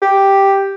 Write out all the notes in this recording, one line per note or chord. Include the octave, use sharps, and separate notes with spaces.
G4